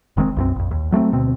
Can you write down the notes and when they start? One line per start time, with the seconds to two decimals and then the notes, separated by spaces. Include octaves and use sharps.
0.17 F1 D#3 G#3 C4
0.36 B1 F#2 C4
0.56 A#1 F2
0.71 D#2
0.92 F#3 A3 A#3 C4
1.12 D2 B2 C4